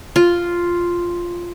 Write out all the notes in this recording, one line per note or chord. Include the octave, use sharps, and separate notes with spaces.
F4